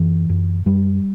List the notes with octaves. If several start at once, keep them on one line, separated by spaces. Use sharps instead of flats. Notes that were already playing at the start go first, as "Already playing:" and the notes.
Already playing: F#2 E3
F#2
F#2 G3